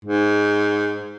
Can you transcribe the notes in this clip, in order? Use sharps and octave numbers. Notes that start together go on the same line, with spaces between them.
G#2